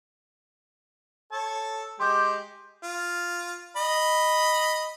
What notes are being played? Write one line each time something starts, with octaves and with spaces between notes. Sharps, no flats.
A4 C#5 A5
G#3 G4 C6 D6 G6
F4
D#5 B5